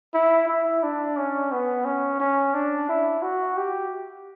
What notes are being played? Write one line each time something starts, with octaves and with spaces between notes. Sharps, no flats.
E4
E4
D4
C#4
B3
C#4
C#4
D4
E4
F#4
G4